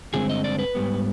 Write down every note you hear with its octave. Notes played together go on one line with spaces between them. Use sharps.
G2 D3 G#3 C4 G#4
D#5
D5
B4
G#2 G3 B3